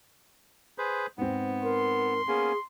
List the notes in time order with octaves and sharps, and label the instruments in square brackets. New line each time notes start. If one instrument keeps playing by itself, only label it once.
[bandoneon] G#4 B4 C5
[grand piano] G#2 C4 [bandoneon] B3
[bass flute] A#4 [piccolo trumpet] C6
[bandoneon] A#3 B3 C#4 [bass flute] G#4